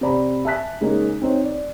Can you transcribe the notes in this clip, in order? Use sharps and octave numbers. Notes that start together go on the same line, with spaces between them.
C3 C5 D5 A#5 B5
E5 G#5 A5 F#6 B6
C#3 G#3 A#3 C#4 D#4
C4 D#4 C5 C#5
D5